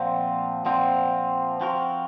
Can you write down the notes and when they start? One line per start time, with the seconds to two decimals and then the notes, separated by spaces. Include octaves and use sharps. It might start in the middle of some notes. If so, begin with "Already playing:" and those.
Already playing: A#2 F3 C4 F#5
0.66 A#2 F3 C4 F#5
1.61 F3 C4 F#4 A#4